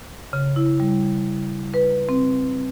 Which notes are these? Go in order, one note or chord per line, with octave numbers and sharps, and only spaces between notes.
C#3
E4
G3
B4
C4